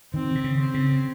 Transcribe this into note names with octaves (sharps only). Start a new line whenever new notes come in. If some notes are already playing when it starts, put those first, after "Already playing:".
D#3 C4
C3
C#3
C4
C#3